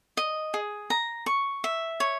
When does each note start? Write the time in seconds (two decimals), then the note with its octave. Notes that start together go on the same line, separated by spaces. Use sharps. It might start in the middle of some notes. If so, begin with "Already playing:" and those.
0.17 D#5
0.54 G#4
0.90 A#5
1.26 C#6
1.64 E5
2.00 C#5